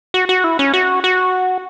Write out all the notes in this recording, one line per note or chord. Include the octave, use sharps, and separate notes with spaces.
F#4
F#4
E4
C#4
F#4
F#4